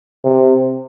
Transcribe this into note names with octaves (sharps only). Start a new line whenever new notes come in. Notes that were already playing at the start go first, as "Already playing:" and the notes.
C3